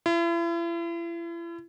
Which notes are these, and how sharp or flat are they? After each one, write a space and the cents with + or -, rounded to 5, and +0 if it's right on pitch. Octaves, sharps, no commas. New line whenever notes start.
E4 +40